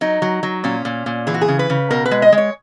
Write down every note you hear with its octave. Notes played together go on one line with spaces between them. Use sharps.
F#3 D#4
F#3
F#3
A#2 C#4
A#2
A#2
E3 G#4
F#4
G#4
C#3
B4
C#3
B2 A#4
B4
G#3
D#5
G#3
C#5